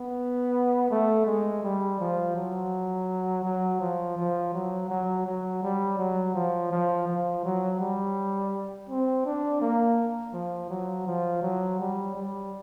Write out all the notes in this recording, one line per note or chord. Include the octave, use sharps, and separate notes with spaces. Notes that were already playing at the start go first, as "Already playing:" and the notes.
Already playing: B3
A3
G#3
G3
F3
F#3
F#3
F3
F3
F#3
F#3
F#3
G3
F#3
F3
F3
F3
F#3
G3
C4
D4
A#3
F3
F#3
F3
F#3
G3
G3